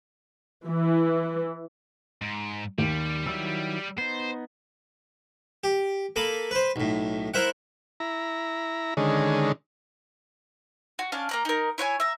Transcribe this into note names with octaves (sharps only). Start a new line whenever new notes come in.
E3
G#2
D#2 G3
D#3 F#3 E4 E6
B3 D#4 C5
G4
A#3 A4 B5 D#6
B4 C5
B1 A2
E4 A#4 C5 E5 F#5
E4 A#5
D3 D#3 G#3 C#4
F#4
C#4 D4 F5 A5
A#3 A#5 F#6
D#4 A#4
E4 C#5 F#5 G#5
E5 A#5